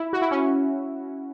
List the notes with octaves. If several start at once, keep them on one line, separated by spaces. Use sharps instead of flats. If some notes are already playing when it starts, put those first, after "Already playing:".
Already playing: E4
F#4
E4
C#4